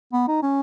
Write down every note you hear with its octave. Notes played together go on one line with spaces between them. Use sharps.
B3
D#4
C#4